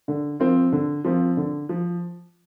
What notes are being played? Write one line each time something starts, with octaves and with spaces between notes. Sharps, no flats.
D3
F3 C4 F4
D3
F3 C4 F4
D3
F3